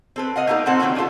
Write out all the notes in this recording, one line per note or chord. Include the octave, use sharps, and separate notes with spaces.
C4 A4 B4
D#5 F5 F#5
A3 B3 D#4 G4 A#4
A#2 C4 A4 F#5 A#5
B2 D#3 C4 C#4 C#5 G5
C#4 D4 E4 F4 A4